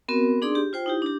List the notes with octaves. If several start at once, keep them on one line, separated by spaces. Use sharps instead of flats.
B3 C4 F#4 A#4
D4 D#4 G#4 D5 C6
G4
F4 C5 G5
D#4 E4 G4
D4 G4